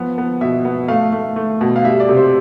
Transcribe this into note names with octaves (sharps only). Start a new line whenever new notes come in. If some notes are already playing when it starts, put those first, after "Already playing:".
Already playing: F3 B3
B3
B2 E5
B3
A3 F5
A3
A3
B2
F5
G3 E5
D5
C3
C5